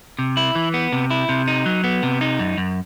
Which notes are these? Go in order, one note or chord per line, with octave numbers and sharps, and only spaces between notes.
C3
E4
E3
B3
C3
E4
C3
D#4
F#3
B3
C3
D#4
F#2
F#2